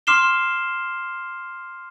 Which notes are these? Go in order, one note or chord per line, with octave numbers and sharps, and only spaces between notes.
C6 D6 F6 C7 E7 G7